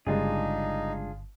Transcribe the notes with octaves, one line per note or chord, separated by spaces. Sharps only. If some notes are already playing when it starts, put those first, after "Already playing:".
G1 C#3 G3 G#3 D4 D#4 F4 G#4